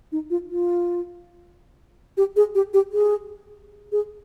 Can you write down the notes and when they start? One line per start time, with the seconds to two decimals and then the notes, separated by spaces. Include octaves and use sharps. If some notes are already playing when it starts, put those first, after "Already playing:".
0.12 D#4
0.30 F4
0.50 F4
2.17 G4
2.36 G#4
2.55 G4
2.74 G4
2.92 G#4
3.92 G#4